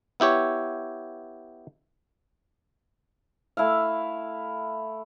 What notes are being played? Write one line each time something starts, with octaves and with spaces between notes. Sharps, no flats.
B3 E4 G4 C#5
A3 E4 E5 F5